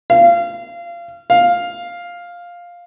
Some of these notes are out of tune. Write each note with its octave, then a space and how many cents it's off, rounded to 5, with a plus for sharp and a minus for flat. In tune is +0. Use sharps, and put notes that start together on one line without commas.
F5 -25
F5 +5